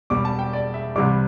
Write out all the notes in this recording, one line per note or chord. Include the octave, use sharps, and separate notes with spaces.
E1 E2 B2 G3 D6
A5
G5
D5
E5
C2 C3 E3 G3 D6